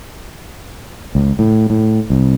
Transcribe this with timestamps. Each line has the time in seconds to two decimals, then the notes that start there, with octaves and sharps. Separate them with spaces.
1.15 C#2
1.39 A2
1.70 A2
2.10 C2